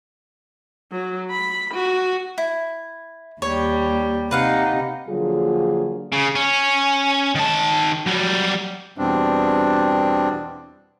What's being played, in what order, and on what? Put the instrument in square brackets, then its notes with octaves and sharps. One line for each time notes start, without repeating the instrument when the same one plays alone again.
[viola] F#3
B5
F#4
[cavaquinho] E4
[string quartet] D#2 G3 [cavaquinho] C#5
[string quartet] C3 D#4 [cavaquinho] B4 F5 F#5
[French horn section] D3 F3 F#3 A#3 F4 G#4
[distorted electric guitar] C#3
C#4
D#3 A5
F#3 G3
[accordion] E2 B2 G3 C4 D4